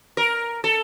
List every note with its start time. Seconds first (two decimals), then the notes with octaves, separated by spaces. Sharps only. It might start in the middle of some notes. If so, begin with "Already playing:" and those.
0.17 A#4
0.64 A4